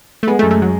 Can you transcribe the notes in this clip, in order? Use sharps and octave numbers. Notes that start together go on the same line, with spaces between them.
A3
G#3 B3
A3
F#2
A3
F#3